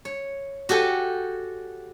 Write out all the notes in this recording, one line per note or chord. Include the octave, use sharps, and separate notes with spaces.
C#5
F#4 G4 A4 G#5